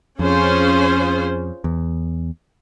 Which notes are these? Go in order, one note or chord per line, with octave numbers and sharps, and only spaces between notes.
F2 C#4 F4 G#4 C5
E2